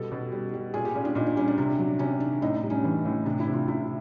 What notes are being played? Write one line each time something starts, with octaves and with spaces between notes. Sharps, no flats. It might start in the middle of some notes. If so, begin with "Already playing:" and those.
Already playing: B2 G3 A4
B2
G3
G3
A#2 G#4
G4
A#2 C#4
D4
A#2 D#4
D4
G3 C#4
D4
C3 D4
F#3
C3 C#4
D#3 D4
A2 D#4
D4
G3
C#4
E3
A2
C3 D4
E4
C3
F4
C3 E4